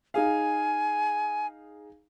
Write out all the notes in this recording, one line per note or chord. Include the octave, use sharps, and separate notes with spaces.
D#4 G#4 F5 G#5